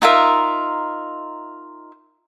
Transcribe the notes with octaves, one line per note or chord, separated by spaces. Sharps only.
D#4 F4 A#4 E5